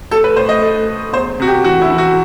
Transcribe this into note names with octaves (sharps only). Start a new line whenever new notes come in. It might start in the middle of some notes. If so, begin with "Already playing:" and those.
A3 A4
B4
A2 C5
D#5
A3
A3
E2 C5
C3 F#4
G4
E3 F#4
E4
E3
F#4